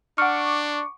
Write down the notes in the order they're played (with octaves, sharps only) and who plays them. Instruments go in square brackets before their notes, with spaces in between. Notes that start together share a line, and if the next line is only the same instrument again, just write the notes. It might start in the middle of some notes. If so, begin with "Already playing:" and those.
[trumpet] D4 [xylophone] F#5 F6 [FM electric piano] C#6 D6